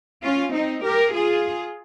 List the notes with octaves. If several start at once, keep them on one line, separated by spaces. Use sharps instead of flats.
C#4 F4
C4 D#4
G4 A#4
F4 G#4